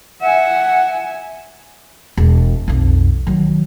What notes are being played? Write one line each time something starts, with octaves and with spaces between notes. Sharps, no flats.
E5 F#5 G#5
E1
B1 F2
D#3 F#3